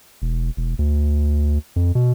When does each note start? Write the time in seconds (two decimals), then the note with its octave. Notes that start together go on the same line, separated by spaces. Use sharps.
0.22 E1
0.57 E1
0.79 D2
1.76 F2
1.95 B2